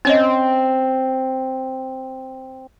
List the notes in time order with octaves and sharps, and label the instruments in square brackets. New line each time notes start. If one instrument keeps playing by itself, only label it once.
[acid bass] C4 [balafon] C#4 C#5 D#5